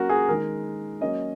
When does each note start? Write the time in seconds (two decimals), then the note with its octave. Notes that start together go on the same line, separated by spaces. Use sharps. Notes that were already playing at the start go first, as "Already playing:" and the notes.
Already playing: F#3 A#3 C#4 F#4 A#4
0.09 G#4
0.28 D#3 G#3 D#4 A#4
1.01 F#3 A#3 C#4 D#5